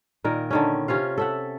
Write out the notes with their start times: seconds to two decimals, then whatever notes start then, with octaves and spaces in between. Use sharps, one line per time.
0.24 A#2 D#3 A#4
0.50 D3 D#3 C#4
0.88 C3 C#4 F4 F5
1.18 A4 E5 F#5